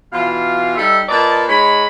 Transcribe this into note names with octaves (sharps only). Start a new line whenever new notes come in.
B2 E3 F4 F5
G3 D#4 A4 E5
A#2 B4 D5 D#5 A5
G#3 D#4 C#5 B5